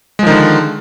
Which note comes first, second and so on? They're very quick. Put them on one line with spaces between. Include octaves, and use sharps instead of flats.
G#3 F3 D#3 D3